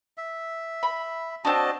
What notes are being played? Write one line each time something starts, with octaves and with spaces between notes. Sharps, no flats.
E5
B5
C4 D4 F#4 D#5 A5